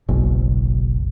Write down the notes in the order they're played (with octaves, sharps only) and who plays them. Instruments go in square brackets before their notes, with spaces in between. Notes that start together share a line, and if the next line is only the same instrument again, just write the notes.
[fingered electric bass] F#1 B1